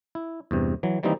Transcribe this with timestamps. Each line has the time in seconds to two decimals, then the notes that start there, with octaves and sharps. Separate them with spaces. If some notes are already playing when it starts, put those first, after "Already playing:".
0.15 E4
0.51 E2 G2 C3
0.83 E3 F#3
1.03 D#3 E3 G3 A#3 C4 D#4